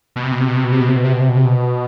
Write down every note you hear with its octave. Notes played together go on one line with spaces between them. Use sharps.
B2
C3
B2
C3
B2
C3
B2
C3
B2
C3
B2
C3
B2
C3
B2
C3
B2